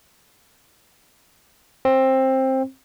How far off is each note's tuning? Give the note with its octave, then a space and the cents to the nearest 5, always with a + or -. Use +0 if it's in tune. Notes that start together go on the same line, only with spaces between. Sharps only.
C4 +15